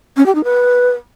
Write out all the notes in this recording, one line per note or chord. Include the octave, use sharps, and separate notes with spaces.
C#4
G4
D#4
B4